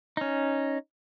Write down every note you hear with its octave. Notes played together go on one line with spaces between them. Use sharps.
C#4 D#4